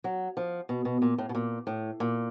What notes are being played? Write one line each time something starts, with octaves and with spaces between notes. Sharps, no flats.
F#3
F3
B2
B2
A#2
A2
B2
A#2
A2
A#2